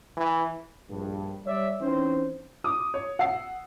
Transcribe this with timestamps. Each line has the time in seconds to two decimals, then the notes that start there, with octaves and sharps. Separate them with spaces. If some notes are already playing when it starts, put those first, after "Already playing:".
0.17 E3
0.90 A#1 G2
1.46 G3 C#5 D5 E5
1.80 E3 C4 C#4 D#4 C5
2.64 D6 D#6
2.94 C#5
3.19 F#5 E6 C7